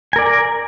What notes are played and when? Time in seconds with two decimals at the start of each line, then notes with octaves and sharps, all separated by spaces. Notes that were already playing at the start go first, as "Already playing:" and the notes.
0.13 G#5
0.16 A#4
0.19 D5